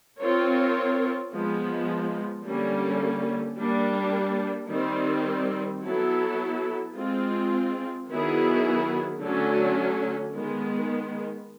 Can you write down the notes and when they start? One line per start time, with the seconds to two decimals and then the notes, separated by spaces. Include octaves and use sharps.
0.20 C4 F4 A#4 C#5
1.32 F3 G#3 B3
2.45 D3 G3 A#3 C#4
3.57 G3 A#3 D4
4.70 D#3 G3 C4
5.83 F#3 B3 E4 A4
6.95 G#3 C4 F4
8.09 D#3 F#3 B3 E4 G#4
9.21 D3 F#3 A3 C#4
10.33 D#3 G#3 B3